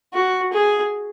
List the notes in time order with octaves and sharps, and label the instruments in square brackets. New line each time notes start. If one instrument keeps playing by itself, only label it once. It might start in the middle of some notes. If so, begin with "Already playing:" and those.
[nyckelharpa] F#4
G#4